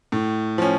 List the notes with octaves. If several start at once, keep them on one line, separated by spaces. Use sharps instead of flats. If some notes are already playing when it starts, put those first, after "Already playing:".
A2
F3 C#4